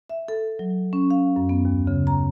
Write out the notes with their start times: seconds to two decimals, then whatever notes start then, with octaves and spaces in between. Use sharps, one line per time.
0.10 E5
0.28 A4
0.59 F#3
0.93 C#4
1.10 F5
1.36 F#2
1.49 B3
1.65 D#2
1.87 C#3
2.07 A#5